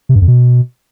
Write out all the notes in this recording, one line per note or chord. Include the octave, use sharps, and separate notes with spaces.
C3
G2
F2
B2